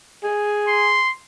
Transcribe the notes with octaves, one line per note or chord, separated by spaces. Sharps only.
G#4
C6